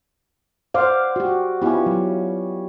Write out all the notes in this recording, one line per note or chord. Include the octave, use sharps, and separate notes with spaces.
C5 D5 F5 F#5
F#4 G4
G3 B3 C#4 E4 F4
F#3